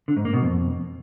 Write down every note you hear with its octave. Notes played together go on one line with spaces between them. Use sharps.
D3
G#2
A#3
B2
F2